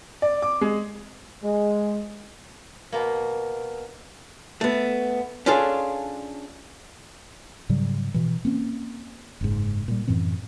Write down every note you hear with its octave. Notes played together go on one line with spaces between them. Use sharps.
D5
D6
G#3
G#3
B2 A#3
A3 B3
C#4 D4 F4 G#4 A4
G#2 C#3 F#3 G3
B2 E3
A#3 C4 C#4
F#1 G#2
A#2 G3
F#2 A2 E3 C4